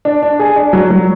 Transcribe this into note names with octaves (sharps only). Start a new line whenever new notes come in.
D4
D4
G#4
D4
F#3
F#3